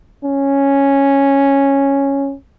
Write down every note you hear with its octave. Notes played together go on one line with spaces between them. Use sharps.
C#4